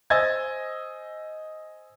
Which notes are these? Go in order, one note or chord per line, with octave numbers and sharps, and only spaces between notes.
C5 D#5 G#5 E6 G#6 A6